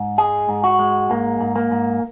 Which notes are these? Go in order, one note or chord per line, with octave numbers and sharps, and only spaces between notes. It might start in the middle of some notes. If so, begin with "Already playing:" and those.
Already playing: G#2
G#3 G#4
G#2
F#4
G#3
G#2 A#3
G#2
A#3
G#2